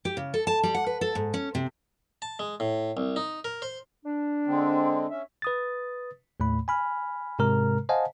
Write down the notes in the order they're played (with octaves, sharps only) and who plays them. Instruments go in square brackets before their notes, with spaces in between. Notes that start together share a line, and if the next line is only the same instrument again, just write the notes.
[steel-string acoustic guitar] G4
C#3
A4
A5
G3
F#5
B4
A4
G#2
C#4
C3
[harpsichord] A5
G#3
A2
C2
D#4
A#4
C5
[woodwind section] D4
[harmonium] D3 G#3 C4
C#4 E5
[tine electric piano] B4 D#6 A6
D#2 A2 A3 B5
G#5 B5 F6
G#2 C3 G#3 A#4 A#5 F6
C5 D#5 F5 F#5 G#5 A5